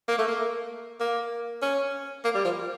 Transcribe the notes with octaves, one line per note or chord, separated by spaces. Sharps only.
A#3
A3
A#3
A#3
C#4
A#3
G3
F3